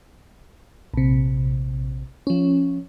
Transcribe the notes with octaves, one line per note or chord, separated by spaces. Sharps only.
A#1 C3
F3 C#4